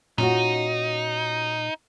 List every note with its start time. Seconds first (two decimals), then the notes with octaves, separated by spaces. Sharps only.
0.18 A#2 C#4 D#4 F4 F#4